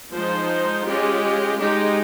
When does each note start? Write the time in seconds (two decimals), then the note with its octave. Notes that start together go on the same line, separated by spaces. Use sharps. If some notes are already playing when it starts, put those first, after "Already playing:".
0.12 F3 G#3 D#4 C5
0.87 G#3 C#4 F4 G4
1.60 G#3 D#4 G4